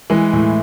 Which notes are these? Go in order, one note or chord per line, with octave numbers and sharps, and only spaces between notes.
E3 G#3
A2